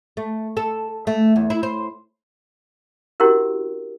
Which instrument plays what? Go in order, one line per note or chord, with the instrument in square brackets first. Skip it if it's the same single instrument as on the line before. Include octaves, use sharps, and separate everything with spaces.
[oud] A3
A4
A3
E2
E4
C5
[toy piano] C#4 D4 E4 F#4 G4 A#4